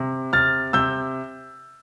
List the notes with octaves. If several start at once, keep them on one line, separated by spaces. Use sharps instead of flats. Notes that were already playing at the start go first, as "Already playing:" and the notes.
Already playing: C3
C3 F6 A6
C3 E6 G6